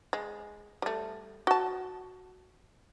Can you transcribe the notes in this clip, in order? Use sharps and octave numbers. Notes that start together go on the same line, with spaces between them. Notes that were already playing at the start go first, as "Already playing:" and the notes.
G#3
G3 A3
F#4 A5